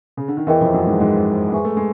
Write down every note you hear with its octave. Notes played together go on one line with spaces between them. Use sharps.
C#3
D3
D#3
E2 E3 A#4 D#5 G5
F2 F3
F#2 F#3
G#2 G#3
G#2 G#3
G#3 B4 E5 G#5 C#6
A3
G#3